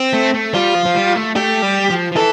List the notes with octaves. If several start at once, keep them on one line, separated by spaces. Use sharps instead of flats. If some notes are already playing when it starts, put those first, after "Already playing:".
Already playing: C4
A3
A3
G3 F4
F3
F3
G3
A3
A3 G4
G3
F3
F3
E3 A4